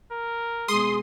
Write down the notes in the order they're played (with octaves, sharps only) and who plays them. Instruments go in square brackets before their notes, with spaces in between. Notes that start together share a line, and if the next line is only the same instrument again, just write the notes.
[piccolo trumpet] A#4
[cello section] B2 G#3 [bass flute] G#4 [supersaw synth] C6 D#6